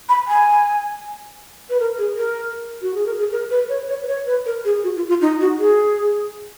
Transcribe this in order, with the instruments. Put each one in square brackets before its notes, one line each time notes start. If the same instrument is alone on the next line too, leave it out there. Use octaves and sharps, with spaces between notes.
[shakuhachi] B5
G#5
B4
A#4
G#4
A#4
F#4
G#4
A#4
G#4
A#4
B4
C#5
C#5
B4
C#5
B4
A#4
G#4
F#4
F4
F4
D#4
F#4
G#4